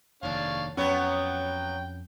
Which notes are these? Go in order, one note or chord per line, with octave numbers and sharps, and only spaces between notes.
F1 D#2 D4 C#5 F5
F2 F#3 B3 C#4 C#5 G5